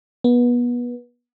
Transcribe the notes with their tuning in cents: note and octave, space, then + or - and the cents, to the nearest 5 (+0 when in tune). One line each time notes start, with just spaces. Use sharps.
B3 -25